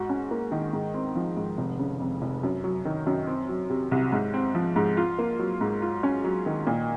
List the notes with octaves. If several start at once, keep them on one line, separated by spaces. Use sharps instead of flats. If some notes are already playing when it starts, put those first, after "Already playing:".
Already playing: G#2 F#4
C#4
A#3
D#3
G#2
C4
F3
G#2
F1
C#3
F2
F1
F#2
F#3
D#3
F#2
C4
F#3
C3
C2
G#2
C4
F3
G#2
F4
A#3
F#3
G#2
F4
C#4
F#3
D#3
A#2